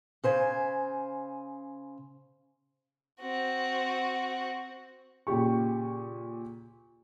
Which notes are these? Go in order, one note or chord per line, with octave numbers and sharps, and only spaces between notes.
C#3 C5 G#5
C4 F#4
A#2 C#3 G4 C#6